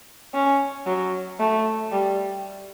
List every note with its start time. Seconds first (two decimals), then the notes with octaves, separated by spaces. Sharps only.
0.34 C#4
0.86 F#3
1.40 A3
1.92 G3